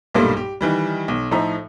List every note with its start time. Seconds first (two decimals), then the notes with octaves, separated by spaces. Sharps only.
0.15 B1 G2 A#2 G3 A3 A#3
0.37 G4
0.61 D#3 E3 G3
1.08 B1
1.31 A2 F3 D#4 E5 A#5